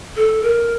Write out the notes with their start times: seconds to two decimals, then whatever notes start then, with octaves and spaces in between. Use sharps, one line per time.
0.16 A4
0.43 A#4